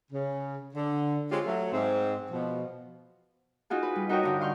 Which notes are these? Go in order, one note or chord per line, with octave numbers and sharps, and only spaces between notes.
C#3
D3
G#3 C4 C#4 F4 G4
F#3 A3
G#2 C4
B2 F3
D#4 F4 F#4 G#4
B4
G3
D#4 F#4 A#4 C#5 D#5 G5
G2 D3 D#4
F5 C6 C#6 F6 G6